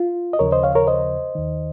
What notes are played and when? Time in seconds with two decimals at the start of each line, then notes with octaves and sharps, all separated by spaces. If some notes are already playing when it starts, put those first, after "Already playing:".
Already playing: F4
0.33 D#5
0.39 D#2 C#3 F3 A#4 C#5
0.52 C5 D#5
0.63 C#5 F5
0.75 A#4 C#5
0.87 C5 D#5
1.35 D#2 D#3